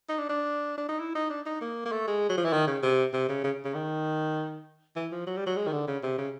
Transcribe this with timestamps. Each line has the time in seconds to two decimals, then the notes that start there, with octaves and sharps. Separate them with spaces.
0.09 D#4
0.19 D4
0.29 D4
0.78 D4
0.89 D#4
1.00 E4
1.15 D#4
1.30 D4
1.46 D#4
1.61 A#3
1.85 A#3
1.92 A3
2.08 G#3
2.29 F#3
2.37 F3
2.45 E3
2.53 D#3
2.67 C#3
2.83 C3
3.13 C3
3.29 C#3
3.44 C#3
3.65 C#3
3.74 D#3
4.96 E3
5.12 F3
5.27 F#3
5.37 G3
5.47 F#3
5.57 G#3
5.67 D#3
5.73 D3
5.88 C#3
6.03 C3
6.18 C#3